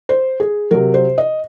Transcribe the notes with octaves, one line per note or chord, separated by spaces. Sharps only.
C5
G#4
C3 F#3 A#4
C5
D#5